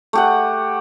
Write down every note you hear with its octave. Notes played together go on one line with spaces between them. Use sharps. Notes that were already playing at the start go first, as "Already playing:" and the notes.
A3 G4 F#5